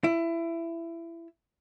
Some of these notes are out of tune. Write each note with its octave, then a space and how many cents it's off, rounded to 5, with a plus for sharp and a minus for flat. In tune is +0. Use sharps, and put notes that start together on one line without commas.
E4 +20